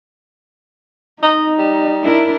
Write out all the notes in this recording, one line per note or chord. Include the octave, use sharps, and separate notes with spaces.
D#4 D#5
G3
D4 E4 A#4